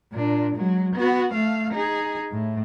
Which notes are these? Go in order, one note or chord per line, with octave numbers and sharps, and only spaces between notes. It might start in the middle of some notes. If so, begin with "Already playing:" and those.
A#2 D4
F#3 G#3
B3 F#4
A3 F5
D#4 G#4
A2